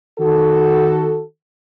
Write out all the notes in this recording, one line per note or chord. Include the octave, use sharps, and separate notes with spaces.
D#3 F#4 A4